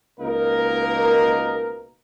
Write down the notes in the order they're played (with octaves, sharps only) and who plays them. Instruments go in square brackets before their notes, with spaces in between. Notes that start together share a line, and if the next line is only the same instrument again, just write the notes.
[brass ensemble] C#2 B2 A#3 D#4 A#4